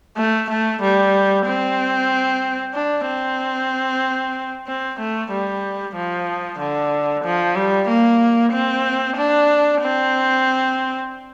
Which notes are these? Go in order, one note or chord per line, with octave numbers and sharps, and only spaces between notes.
A3
A3
G3
C4
D4
C4
C4
A3
G3
F3
D3
F3
G3
A#3
C4
D4
C4